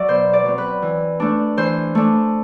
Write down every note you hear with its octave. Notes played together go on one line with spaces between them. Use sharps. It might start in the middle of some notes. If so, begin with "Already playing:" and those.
Already playing: F#3 D5 E5
B2 C5
D5
F#3 C4
B4
E3
A3 D4
E3 C5
A3 D4